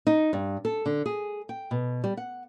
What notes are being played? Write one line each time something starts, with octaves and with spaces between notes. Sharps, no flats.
D#4
G2
A4
D3
G#4
G5
B2
G3
F#5